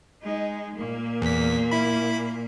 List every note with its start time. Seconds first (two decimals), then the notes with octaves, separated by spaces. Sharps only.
0.23 G#3 D#4
0.76 A#2 A#3
1.22 E2 B6
1.71 E4 B5